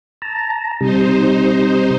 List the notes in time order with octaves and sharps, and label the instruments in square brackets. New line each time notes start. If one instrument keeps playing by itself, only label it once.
[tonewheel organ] A5 A#5
[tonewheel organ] C3 G3 [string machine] D#4 C5